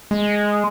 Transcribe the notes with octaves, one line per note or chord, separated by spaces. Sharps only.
G#3